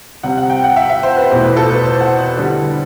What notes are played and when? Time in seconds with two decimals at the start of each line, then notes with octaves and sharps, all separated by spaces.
0.23 C3 G3 C4 F#5
0.37 F#5
0.50 G5
0.64 F#5
0.76 E5
0.89 E5
1.03 C5
1.17 B4
1.30 E2 B2 A3 E4 C5
1.44 B4
1.57 A4
1.70 B4
1.84 C5
2.01 F#5
2.37 D3 G3 B3 E4